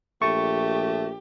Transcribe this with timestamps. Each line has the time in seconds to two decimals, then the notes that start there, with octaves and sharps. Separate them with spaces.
0.22 A#1 A3 G4 C#6